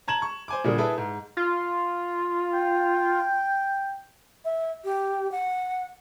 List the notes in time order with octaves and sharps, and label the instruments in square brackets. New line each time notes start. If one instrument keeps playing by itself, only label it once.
[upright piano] A5 A#5 G#6 E7 F#7
C#6
C5 G#5 D6
A#2 D3 G3 A#3 G#4
E4 G#4 A4 B4
G#2
[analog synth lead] F4
[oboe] G5
[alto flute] E5
G4
F#5